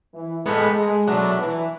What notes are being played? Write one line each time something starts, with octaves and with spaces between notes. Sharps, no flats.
E3
A2 E3 G#3 B3
G#3
B2 F#3 A3 D4
E3